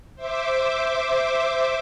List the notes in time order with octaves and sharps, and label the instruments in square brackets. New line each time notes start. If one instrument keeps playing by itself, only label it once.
[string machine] C5 E5 D6